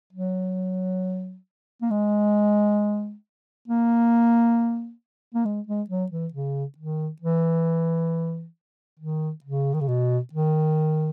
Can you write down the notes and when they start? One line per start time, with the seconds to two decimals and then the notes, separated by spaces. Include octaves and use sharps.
0.13 F#3
1.82 A#3
1.91 G#3
3.68 A#3
5.35 A#3
5.45 G#3
5.67 G#3
5.90 F#3
6.12 E3
6.33 C#3
6.78 D#3
7.22 E3
8.99 D#3
9.44 C#3
9.74 D#3
9.81 C#3
9.88 B2
10.33 D#3